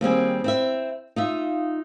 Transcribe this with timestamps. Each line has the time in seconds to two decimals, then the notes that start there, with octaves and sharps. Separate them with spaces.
0.01 D#2 G3 C4 G#4
0.44 C4 E4 E5
1.16 D#4 F4 E5